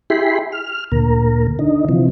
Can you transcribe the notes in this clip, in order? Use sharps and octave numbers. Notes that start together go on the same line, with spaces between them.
E4 G4 G#4 B5 C6
F6
D2 A#2 A#4
D3 D#4
C3 E3 F3